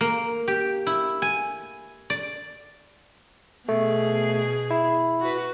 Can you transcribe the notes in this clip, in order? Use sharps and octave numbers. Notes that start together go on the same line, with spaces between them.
A#3
G4
E4
G#5
D5
B2 A3 G#4
E4
F#4 B4